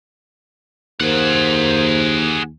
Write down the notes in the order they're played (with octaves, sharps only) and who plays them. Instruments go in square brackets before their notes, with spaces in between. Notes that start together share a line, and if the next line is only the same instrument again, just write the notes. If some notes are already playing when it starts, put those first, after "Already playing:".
[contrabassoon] D#2 [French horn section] A#3 A#4 C5 [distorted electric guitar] G#4 F#5